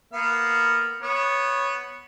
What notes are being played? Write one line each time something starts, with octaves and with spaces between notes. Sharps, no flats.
A#3 B3 F5
B3 C#5